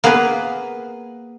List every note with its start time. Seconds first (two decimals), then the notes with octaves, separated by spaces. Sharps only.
0.04 A#3 B3 G#4 A#4 B4